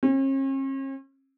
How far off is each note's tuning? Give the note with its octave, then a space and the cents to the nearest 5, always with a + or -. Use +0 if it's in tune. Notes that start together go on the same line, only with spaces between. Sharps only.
C#4 -45